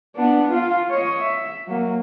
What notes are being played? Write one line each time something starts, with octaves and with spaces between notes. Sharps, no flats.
B3 D4
F4 F5
C#5 D#5
E5
F#3 A#3